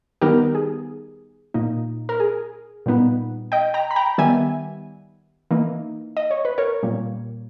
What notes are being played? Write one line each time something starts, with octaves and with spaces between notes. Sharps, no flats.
D#3 G3 B3 D#4 G4 A#4
G#4
A#2 A#3 D#4
A#4
G#4
A#2 G3 B3 D#4
D#5 G5
G5 A#5
B5
G5 A#5
D#3 G3 B3 E5 G#5
E3 A#3 D#4
D#5
C#5
B4
A#4 C#5
A#2 G3 A#3